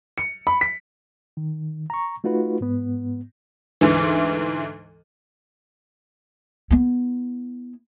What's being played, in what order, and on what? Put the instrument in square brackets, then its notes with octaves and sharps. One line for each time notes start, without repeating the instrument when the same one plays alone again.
[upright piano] C#7
B5
B6
[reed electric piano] D#3
A#5 C#6
A3 D#4 F4 F#4 B4
G#2 B3
[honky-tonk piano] D2 G#2 E3
[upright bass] B3 E4